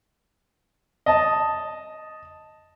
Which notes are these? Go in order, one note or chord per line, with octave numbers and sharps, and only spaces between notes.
D#5 A5